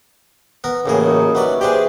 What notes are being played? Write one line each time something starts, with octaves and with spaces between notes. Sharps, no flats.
B3 A#4
A1 A2 C#3 A#3 G4 G#4
F#3 D#4 D#5
E3 F#3 G3 B4 C#5 D5
G4 G#4 B4 C5 D5